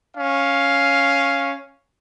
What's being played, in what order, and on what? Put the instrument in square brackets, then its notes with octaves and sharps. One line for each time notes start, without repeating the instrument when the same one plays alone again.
[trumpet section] C#4 F5